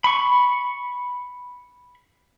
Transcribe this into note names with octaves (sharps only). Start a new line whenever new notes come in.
B5 C#6